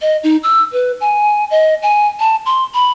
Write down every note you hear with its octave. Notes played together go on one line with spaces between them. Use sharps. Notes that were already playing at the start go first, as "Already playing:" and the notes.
D#5
D#4
E6
B4
G#5
D#5
G#5
A5
C6
B5